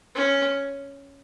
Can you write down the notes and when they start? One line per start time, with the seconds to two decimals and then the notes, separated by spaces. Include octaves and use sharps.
0.15 C#4